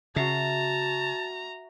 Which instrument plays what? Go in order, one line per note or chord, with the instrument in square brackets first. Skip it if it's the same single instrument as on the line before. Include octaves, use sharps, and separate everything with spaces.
[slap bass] C#3 [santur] F#4 E5 [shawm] A5 [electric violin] A#5